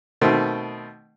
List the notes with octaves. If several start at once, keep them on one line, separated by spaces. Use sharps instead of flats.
B2 D#3 A3 C4